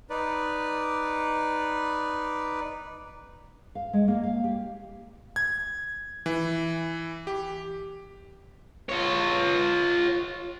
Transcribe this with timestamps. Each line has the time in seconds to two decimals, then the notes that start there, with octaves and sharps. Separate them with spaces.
0.10 D#4 B4 D5
3.75 F5
3.93 G#3
4.08 A#3
4.23 F5
4.44 G4
5.36 G#6
6.26 E3
7.27 G4
8.89 F4 C#5